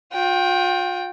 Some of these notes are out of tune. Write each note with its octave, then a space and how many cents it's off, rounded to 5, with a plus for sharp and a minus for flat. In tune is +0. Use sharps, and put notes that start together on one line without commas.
F4 +40 G5 +0